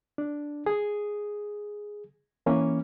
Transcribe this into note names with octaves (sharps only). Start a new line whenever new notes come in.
D4
G#4
E3 A#3 C#4